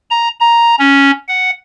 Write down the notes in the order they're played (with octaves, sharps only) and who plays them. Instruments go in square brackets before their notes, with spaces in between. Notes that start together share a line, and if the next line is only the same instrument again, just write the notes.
[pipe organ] A#5
A#5
C#4
F#5